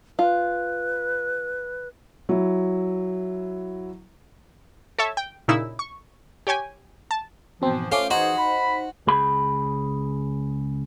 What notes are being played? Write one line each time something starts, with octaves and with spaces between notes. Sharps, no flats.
F4 B4
F#3 E4
A4 C#5 E5 A5
G5
A#2 C#3 D#4 E4 E6
C#6
G4 C#5 G5 G#5
A5
G#2 B2 E3 F3 C4
A3 C#4 F4 C5 F5 D6
E3 D#4 F#4 G#4 C5
B5
C#2 G#4 B5